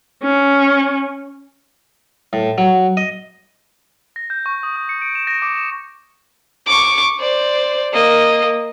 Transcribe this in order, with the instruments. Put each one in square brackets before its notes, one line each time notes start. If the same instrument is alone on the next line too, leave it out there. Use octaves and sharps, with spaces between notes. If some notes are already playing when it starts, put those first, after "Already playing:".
[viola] C#4
[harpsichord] A2
F#3
D#5
[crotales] A#6
G6
C#6
D#6
D#6
C#7
D7
E7
A#6
D6
E7
[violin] C#6 D6
C5 D5
A#3 D#5